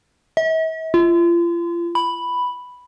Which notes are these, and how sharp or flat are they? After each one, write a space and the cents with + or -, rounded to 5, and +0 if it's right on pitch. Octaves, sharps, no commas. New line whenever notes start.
E5 -45
F4 -35
B5 +0